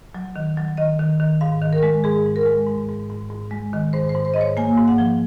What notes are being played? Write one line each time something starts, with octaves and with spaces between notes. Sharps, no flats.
F#3
D#3
F#3
D#3 D#5
D#3
D#3
G#2 F5
D#3
A#4
G#3
G#2 G#4
G#2
A#4
G#3
G#2
G#2
G#2
G#2
G#3
D#3
G#2 C5
C5
G#2
C5
D#5
G#2 C#5
A#3 G#5
G#2
F#5
F3